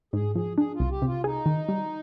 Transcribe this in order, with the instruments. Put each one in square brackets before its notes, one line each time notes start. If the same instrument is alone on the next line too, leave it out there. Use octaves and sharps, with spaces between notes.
[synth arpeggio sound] G#2 [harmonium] G#4
[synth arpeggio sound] F3 [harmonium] G#4
[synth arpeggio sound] D4 [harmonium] G#4
[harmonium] F4
[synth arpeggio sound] C2
[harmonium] G4
[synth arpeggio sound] C3 [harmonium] F4
[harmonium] D#4 [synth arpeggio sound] G#4
[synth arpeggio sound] D#3
G3